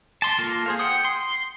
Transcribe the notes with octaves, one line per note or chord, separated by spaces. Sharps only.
A5 C6
A#3 F4 A4 A#4
G#4 C5 F5
F#5 G5 D#6
C6